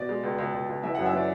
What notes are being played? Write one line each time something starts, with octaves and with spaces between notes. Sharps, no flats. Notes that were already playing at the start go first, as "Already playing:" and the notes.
Already playing: B2 D5
G#3
C#2
C#2
C#2
C#2
E3 E5
F#5
F#2
E5
E3 D5